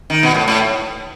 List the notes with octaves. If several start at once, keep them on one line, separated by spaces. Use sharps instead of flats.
D#3
B2
A2
A2